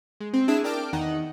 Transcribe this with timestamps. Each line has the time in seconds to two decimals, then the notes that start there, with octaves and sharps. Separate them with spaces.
0.20 G#3
0.33 C4
0.48 D4 E4 G#4 E7
0.64 A#4 D5 G5 A5 D6 F6
0.93 E2 D#3 D#4 F#5